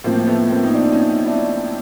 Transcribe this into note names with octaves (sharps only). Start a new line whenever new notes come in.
A2 F3 A#3 C4
A3 B3
A#3 C4
D#4
C4 D4
C#4 D#4
D4 E4